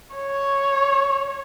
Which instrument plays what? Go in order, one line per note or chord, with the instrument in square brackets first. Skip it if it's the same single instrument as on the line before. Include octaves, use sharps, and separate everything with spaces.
[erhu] C#5